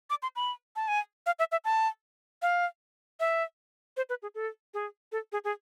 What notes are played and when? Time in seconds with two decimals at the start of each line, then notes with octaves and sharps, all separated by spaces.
0.10 D6
0.23 C6
0.36 B5
0.76 A5
0.88 G#5
1.26 F5
1.39 E5
1.52 E5
1.65 A5
2.42 F5
3.20 E5
3.97 C5
4.10 B4
4.22 G#4
4.35 A4
4.74 G#4
5.12 A4
5.32 G#4
5.44 G#4